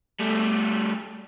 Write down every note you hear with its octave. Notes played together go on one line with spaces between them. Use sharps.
G3 A3